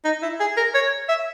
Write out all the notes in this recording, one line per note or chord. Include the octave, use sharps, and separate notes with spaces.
D#4
E4
G#4
A#4
C#5
E5